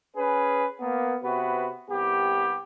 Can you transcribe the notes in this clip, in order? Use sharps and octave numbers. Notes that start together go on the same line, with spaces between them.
C#4 G#4 B4
A#3 B3
C3 B3 F#4 B4
C2 B3 G4